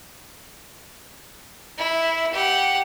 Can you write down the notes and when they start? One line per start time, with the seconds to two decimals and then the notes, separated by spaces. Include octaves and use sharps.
1.78 E4
2.33 G4 F#5